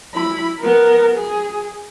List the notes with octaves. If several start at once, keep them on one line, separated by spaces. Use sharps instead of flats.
E4 B5
B3 A#4
G#4